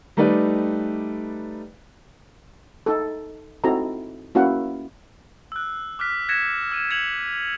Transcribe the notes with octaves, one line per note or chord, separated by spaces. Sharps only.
G3 A3 D#4 B4 D5
D#4 A4
C4 D#4 E4 F#4 A4 A#5
A#3 C#4 E4 F#4 F5 F#5
E6 F#6
D6 F6 F#6 B6
F#6 G#6 A#6 B6 C#7 E7
E6 D#7 E7
G#6 C#7 F7 F#7